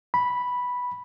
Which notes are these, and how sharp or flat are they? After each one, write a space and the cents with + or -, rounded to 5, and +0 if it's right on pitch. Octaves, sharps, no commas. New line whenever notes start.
B5 -5